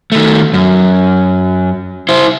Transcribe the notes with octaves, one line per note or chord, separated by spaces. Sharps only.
D#3 A3
F#2
E4 C5